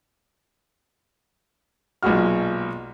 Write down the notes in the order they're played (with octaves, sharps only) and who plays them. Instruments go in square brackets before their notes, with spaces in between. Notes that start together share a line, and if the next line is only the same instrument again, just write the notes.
[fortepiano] B1 A#2 G#3 F#4 F6